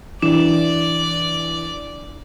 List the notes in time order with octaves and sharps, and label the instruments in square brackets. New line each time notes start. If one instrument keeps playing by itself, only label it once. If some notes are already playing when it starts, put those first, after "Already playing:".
[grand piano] E3 [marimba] D4 [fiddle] D5